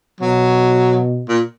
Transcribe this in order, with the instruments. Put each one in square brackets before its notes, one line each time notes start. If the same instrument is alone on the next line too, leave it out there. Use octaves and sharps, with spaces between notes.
[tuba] B2 [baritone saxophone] F#3
[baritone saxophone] A#2